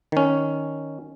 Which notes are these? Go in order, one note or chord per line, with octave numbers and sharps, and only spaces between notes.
D#3 C#4